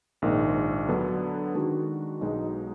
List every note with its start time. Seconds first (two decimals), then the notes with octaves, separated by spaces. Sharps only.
0.22 A#1 G#2 D#3 A#3
0.88 D3 F#3 B3 D4
1.55 D#3 G#3 D4 F#4
2.21 B1 B2 G#3 D#4